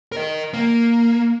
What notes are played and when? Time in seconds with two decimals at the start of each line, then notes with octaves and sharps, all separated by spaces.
0.12 A#4 D#5
0.54 A#3